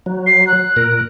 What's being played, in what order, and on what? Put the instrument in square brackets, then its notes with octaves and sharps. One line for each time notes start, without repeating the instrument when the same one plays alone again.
[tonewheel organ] F#3
[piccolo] C7
F#6
[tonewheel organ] A#2 A#4